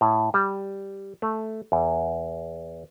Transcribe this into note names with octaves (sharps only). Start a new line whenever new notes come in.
A2
G3
A3
E2